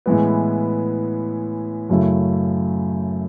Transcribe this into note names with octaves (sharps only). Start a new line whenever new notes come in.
A2 E3 G#3 B3
F#2 C#3 F#3 A3 E4